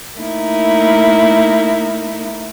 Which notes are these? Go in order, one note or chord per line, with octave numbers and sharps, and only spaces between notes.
A3 A#3 D#4 E4